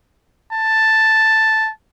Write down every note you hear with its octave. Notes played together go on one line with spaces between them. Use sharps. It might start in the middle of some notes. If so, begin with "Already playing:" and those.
A5